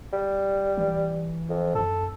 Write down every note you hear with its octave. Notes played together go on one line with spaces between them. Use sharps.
G3
E3
F2
F#2 A4